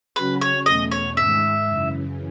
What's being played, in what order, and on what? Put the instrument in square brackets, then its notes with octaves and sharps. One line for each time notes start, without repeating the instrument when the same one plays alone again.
[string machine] C#3 F#3 C#4 F#4 [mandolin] B4
[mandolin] C#5
[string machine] E2 B2 A3 C#4 [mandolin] D#5
[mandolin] C#5
[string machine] G#2 D#3 G#3 [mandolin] E5
[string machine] F#2 C#3 E3